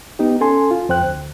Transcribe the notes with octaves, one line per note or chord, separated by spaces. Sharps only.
B3 D#4 G4
C#4 A4 G#5 C6
F4
F2 C5 G5 F#6
D2